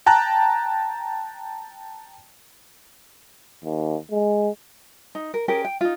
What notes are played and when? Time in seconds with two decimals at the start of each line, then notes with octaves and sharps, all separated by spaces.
0.06 G5 A5 A#5 F#6
3.64 D#2
4.11 G#3
5.15 D#4
5.34 A#4
5.48 C#4 G4 G#4 A#4
5.65 G5
5.81 D#4 F4